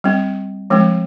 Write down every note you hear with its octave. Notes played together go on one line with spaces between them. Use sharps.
G3 C4
F3 G#3 C4